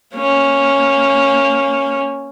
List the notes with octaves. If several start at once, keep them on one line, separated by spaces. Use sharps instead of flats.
A#3 C#4